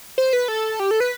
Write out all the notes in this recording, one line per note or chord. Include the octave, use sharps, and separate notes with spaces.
C5
B4
A4
G4
A4
B4